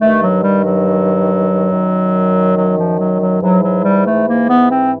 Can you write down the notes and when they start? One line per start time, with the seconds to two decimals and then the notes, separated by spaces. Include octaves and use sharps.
0.02 G2 D#3 A3
0.23 F#3
0.44 G3
0.65 F#3
1.72 F#2 D#3
2.57 F#3
2.78 F3
3.00 F#3
3.21 F#3
3.42 G#2 E3 F#3
3.64 F#3
3.85 G3
4.06 A3
4.28 A#3
4.49 B3
4.70 C4